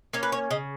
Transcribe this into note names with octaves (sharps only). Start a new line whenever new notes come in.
A#3 C#4 C#5
B4
C#5
C#3 D#5